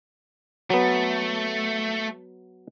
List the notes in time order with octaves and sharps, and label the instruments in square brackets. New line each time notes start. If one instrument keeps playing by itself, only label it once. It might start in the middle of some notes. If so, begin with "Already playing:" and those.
[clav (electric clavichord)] F#3 B3 [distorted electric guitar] A3